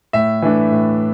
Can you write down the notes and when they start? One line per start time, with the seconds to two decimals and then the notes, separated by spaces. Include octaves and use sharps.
0.13 A2 E5
0.42 E3 A3 D4
0.71 A2